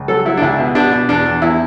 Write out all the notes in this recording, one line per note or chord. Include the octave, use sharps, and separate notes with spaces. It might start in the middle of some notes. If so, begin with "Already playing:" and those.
Already playing: C#2
F#3 A4
F#3 E4
D4
C#2 E4
B2
B2 D4
B2
E2 D4
E2
E2 E4